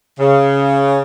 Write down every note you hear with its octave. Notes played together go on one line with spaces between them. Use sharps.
C#3